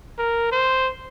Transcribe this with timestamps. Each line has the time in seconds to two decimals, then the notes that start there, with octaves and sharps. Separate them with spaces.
0.19 A#4
0.52 C5